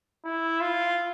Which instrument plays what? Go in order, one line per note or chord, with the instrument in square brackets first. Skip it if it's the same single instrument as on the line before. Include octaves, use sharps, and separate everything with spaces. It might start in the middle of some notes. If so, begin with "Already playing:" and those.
[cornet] E4
F4